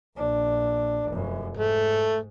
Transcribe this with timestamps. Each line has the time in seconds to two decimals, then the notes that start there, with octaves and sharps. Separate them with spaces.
0.16 A#1 D4
1.07 F1 F#2
1.57 G#2 A3